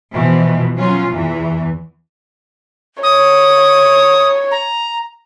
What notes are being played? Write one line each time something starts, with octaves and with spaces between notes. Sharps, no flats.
B2 E3 F3
F#3 C#4 F4
E2 E3
C#5 D#6
A#5